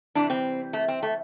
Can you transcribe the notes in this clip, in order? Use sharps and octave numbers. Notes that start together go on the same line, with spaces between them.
C3 E3 G3 D4
C4
A3
C4
A3